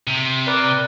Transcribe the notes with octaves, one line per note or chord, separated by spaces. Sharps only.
C3
A#4 B4 D5